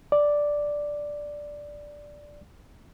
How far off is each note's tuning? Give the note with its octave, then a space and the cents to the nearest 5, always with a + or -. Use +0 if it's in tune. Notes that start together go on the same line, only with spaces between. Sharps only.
D5 +0